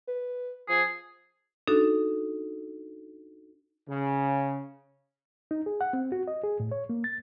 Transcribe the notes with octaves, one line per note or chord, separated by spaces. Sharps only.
B4
F3 G#4
D4 D#4 F#4 A4
C#3
D#4
G#4
F#5
C4
F#4
D#5
G#4
A2
C#5
A#3
A6